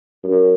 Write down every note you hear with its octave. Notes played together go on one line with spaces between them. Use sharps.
F#2